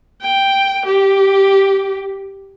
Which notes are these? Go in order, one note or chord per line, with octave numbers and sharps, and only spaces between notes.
G5
G4